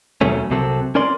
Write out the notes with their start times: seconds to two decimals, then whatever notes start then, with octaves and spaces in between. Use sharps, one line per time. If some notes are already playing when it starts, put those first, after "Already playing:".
0.21 D#2 B2 F#3 A3 C#4
0.50 C2 C3 F#3 C4 A4
0.95 C#4 A#4 D5 C6